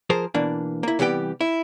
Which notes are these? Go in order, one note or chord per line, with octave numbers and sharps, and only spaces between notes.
F3 G#4 A#4 C5
B2 E3 A#3 D4
A#3 E4
C3 E3 G3 B3 G4 G5
E4